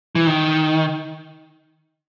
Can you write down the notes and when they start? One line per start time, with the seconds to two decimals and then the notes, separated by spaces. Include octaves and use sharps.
0.15 E3
0.27 D#3